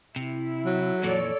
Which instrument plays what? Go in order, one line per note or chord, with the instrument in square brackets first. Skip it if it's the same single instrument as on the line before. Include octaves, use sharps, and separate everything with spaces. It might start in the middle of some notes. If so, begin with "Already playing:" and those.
[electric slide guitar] C3 [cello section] E4
[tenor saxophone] F#3
[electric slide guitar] F2 A#2 E3 [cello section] A4 C#5 D5